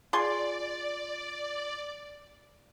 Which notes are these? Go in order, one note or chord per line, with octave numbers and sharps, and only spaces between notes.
F4 G#4 D5 C6